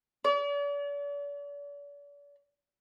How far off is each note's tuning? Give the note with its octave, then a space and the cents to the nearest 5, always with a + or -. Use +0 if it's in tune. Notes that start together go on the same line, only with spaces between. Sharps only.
D5 -45